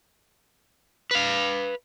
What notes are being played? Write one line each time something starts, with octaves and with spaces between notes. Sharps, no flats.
B4 F5